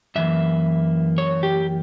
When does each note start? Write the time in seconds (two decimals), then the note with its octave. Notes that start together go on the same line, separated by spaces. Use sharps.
0.16 F#2 E3 A#3 E5
1.18 C#5
1.43 G4